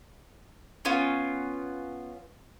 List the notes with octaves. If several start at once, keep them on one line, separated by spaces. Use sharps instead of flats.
B3 C#4 F4